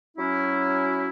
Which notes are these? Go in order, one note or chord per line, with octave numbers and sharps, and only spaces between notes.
F#3 C#4 E4